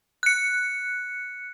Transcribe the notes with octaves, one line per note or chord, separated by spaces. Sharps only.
F#6 C#7